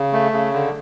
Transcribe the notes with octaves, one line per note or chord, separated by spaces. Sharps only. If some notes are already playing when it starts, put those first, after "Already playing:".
Already playing: C#3
A3
C#3
D3